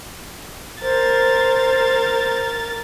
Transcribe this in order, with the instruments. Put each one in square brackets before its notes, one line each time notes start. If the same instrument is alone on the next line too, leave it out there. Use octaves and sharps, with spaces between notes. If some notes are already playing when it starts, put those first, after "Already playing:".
[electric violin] A#4 A6 [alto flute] C5